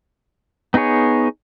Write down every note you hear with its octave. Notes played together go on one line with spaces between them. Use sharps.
B3 D#4 G#4 C#5